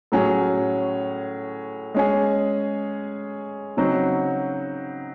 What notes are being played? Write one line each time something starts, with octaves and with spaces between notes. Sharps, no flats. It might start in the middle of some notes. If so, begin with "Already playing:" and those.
A2 F#3 C#4 G#4
G#3 C#4 G#4
C#3 F#3 C4 D#4 F#4